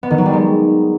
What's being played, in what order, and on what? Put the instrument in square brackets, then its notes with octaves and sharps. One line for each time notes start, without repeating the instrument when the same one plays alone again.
[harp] B3
D#3
F#3
G3
G#3